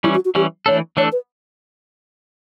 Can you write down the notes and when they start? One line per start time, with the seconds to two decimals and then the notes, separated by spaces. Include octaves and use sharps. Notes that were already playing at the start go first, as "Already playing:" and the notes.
0.04 E3 G3 C#4 E4
0.15 F#4
0.25 F#4
0.35 E3 G3 C#4 G4
0.66 E3 A3 D4 A4 C#5
0.97 E3 A3 D4 A4 C#5
1.12 B4